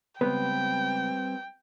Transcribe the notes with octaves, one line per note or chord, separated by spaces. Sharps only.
C#2 G3 B3 C4 B4 G5